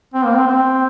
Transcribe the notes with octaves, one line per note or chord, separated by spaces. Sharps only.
C4
A#3
C4
C4